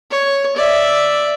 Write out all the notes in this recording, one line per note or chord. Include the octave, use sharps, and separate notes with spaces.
C#5
D5 E5